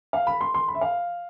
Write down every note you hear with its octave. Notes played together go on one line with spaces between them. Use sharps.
F5
B5
C6
C6
B5
E5
F5